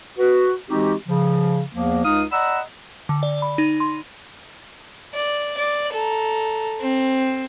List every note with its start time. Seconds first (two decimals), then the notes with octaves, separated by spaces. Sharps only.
0.19 F#4 B4
0.70 E3 G#3 C4 D#4 F#4 G4
1.07 C#3 F3
1.74 E2 F3 A#3
2.04 C#2 D#4 F5 D#6
2.32 D5 D#5 F#5 A#5 B5 E6
3.09 D3
3.23 D5
3.42 B5
3.58 D#4
3.80 C6
5.14 D5
5.57 D5
5.93 A4 A#5
6.81 C4